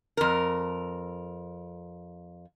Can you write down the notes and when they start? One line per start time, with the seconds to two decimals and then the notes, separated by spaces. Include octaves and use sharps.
0.17 F2 A#4